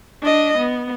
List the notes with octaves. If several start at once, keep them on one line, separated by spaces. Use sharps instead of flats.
D4 D#5
B3